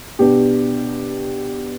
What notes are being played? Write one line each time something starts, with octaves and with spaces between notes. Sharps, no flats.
B2 B3 D4 G4